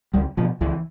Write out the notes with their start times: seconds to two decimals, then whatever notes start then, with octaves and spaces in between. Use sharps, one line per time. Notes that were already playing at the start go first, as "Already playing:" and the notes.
0.14 C#2 G3
0.37 B2 F3
0.61 C#2 E3